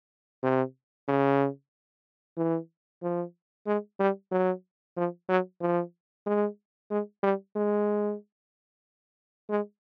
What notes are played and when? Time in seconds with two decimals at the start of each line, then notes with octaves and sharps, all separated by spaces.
0.43 C3
1.08 C#3
2.37 E3
3.03 F3
3.67 G#3
4.00 G3
4.32 F#3
4.97 F3
5.29 F#3
5.61 F3
6.26 G#3
6.91 G#3
7.23 G3
7.56 G#3
9.50 G#3